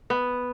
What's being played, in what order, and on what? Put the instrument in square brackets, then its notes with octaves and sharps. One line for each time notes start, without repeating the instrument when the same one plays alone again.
[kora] B3